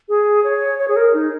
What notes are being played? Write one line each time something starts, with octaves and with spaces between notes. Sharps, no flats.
G#4
C#5
C#5
G#4
A#4
D#4